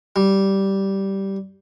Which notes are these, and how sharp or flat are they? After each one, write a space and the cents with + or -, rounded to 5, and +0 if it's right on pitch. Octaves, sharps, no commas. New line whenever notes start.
G3 -10